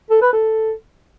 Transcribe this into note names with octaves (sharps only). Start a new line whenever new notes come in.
A4
B4
A4